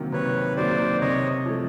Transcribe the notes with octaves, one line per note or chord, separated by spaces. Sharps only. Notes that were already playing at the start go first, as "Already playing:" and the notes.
Already playing: C3 D#3 F#3 A#3
C3 B4 C#5
D#3 F#3 A#3 C5 D5
C3 C#5 D#5
F3 A3